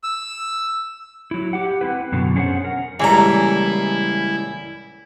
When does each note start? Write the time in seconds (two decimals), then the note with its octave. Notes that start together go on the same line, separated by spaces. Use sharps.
0.04 E6
1.31 F#3 E4
1.53 G4 F#5
1.81 C4 E4 B4
2.12 F#2 B2 D3 F#3
2.36 C#4 D4 G#4 C5 C#5 F#5
2.64 A#4
3.00 C#2 A#2 E3 G3 E4 G#4 A4 A#5